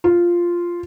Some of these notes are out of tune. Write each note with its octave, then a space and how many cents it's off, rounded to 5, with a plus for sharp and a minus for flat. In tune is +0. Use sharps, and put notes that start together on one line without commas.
F4 -5